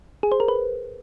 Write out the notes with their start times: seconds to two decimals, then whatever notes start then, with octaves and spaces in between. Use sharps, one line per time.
0.23 G#4
0.32 C5
0.40 A#4
0.48 B4